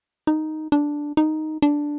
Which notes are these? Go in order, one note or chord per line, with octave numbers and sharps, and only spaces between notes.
D#4
D4
D#4
D4